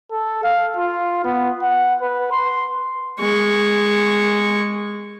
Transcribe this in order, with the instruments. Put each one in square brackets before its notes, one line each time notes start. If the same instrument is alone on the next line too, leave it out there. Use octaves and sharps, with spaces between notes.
[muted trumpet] A4
F5
F4
B3
F#5
B4
C6
[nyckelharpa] G#3 C#6